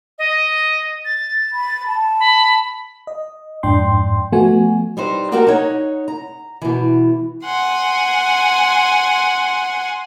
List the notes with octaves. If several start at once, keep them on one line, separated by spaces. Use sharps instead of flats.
D#5
A6
B5
A5
B5
D#5
F2 G#2 D4 G5 C6
F3 A3 B3 F#4 G#5
G3 D#4 B4 C5
A#3 F#4 G4 A#4 A5 A#5
D#4 C#5 F#5
A#5
B2 E3
F#5 G#5 C6